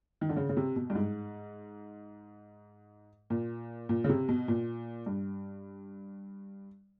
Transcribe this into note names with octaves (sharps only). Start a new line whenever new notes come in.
D#3
D3
C#3
C#3
C3
B2
G2
G#2
A#2
A#2
C#3
C3
B2
A#2
G2